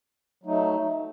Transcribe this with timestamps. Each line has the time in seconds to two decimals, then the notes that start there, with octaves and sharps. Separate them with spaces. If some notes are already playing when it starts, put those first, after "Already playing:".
0.43 F#3 A3 D#4